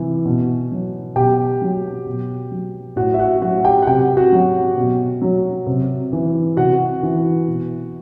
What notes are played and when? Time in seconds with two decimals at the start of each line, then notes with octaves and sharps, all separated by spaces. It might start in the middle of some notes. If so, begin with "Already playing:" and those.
Already playing: C3 E3
0.25 B2
0.72 F#3
1.16 B2 G4 G5
1.62 F#3
2.06 B2
2.51 F#3
2.96 A2 F#4 F#5
3.14 E5
3.20 F#4 F#5
3.41 F#3 F#4 F#5
3.65 G4 G5
3.82 F#5
3.86 C3 G4 G5
4.17 F#4 F#5
4.32 F#3
4.77 B2
5.22 F#3
5.66 C3
6.13 E3
6.57 C3 F#4 F#5
7.03 E3
7.48 B2